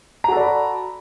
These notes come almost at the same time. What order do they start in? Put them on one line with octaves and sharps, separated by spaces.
A#5 F#4 A4 D5 B5